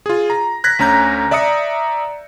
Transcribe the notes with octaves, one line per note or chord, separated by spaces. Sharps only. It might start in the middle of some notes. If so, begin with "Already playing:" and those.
F4 G#4
A#5
F#6 G#6 A#6 B6
D2 C#4 A#5 G6
D5 E5 A#5 D#6 C#7